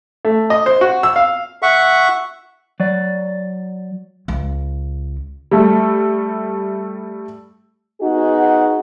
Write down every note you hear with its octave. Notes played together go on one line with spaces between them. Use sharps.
A3
D#5
C5
F#4
E6
F5
E5 F#5 C#6
F#3 D5
C#2
G3 A3
B3 D#4 F#4 G#4